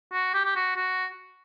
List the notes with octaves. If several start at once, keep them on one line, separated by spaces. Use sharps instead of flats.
F#4
G4
G4
F#4
F#4